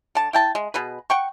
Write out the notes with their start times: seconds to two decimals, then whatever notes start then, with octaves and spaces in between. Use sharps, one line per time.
0.15 D3 A5
0.33 E4 G5 A5
0.55 G#3
0.74 B2 G#4 B4
1.10 F#5 G5 C#6